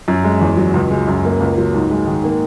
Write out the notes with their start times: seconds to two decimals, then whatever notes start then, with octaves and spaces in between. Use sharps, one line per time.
0.08 F#2
0.24 G#3
0.41 E2
0.57 F#3
0.74 C#2
0.91 G#3
1.07 F#2
1.25 A#3
1.40 C#2
1.58 F#3
1.74 G#2
1.90 G#3
2.07 D#3
2.24 A#3